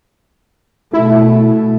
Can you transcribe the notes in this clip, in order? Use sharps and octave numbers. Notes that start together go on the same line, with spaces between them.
B2 A3 E4